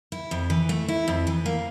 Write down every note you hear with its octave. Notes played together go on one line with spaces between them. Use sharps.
E4
F2
E3
A3
E4
F2
E3
A#3